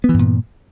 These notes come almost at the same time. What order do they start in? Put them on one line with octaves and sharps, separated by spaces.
B3 E3 G2 A#2